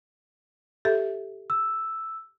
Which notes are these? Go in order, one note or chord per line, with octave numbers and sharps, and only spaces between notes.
G4 A4 E5
E6